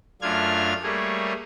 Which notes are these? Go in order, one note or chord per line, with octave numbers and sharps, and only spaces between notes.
F#2 A3 D4 F4 F6 G#6
G3 A3 A#3 G#4 C#5